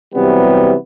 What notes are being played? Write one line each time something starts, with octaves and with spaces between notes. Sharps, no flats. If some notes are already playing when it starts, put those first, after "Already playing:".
C3 E3 F#3 G3 B3